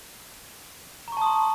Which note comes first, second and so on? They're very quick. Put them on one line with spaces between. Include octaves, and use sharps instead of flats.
A#5 C#6 A5 D#6 C6